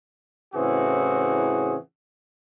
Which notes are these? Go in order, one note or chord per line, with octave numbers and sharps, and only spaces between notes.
A2 C#3 E3 C4 F#4 G#4